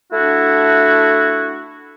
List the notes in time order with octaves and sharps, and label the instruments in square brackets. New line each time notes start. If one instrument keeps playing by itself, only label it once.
[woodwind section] A3 D4 E4 F#4